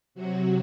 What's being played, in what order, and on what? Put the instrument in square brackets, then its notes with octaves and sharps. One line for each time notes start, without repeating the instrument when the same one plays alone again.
[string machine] C3 F#3 F#4